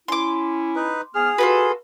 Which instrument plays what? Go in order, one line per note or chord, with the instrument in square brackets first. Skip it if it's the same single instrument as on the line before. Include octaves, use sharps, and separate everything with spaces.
[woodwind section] C#4 E4 [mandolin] C6 D6
[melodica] D#4 B4
[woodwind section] G#2 B3 F6 [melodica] G#4
[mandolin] F4 A4 B4 [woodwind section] F#4